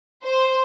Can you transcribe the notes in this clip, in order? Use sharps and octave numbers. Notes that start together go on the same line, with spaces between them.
C5